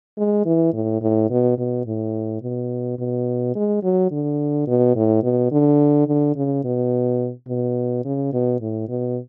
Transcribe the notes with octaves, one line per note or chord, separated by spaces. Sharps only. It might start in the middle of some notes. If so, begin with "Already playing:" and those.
G#3
E3
A2
A2
B2
B2
A2
B2
B2
G#3
F#3
D3
B2
A2
B2
D3
D3
C#3
B2
B2
C#3
B2
A2
B2